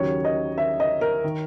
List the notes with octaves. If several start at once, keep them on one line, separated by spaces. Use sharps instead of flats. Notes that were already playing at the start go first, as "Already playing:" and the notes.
Already playing: D#2 C#3 F#3 C#5
D#5
E5
D#5
A#4
D#3